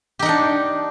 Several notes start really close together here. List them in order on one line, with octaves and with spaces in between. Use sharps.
G4 D#4 F#5 D4